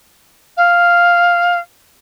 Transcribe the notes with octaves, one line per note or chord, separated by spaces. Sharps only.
F5